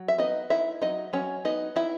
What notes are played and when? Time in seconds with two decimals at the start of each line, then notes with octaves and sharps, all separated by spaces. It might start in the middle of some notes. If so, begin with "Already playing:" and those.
Already playing: F#3
0.08 E5
0.18 B3 D#4 D#5
0.50 D#4 E4 E5
0.82 F#3 D#4 D#5
1.13 F#3 C#4 C#5
1.45 B3 D#4 D#5
1.76 D#4 E4 E5